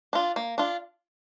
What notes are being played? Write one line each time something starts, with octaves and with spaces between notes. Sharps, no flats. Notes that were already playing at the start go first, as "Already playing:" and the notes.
D4 F4
A#3
D4 F4